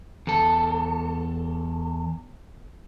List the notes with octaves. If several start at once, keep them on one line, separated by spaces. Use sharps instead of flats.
E2 A4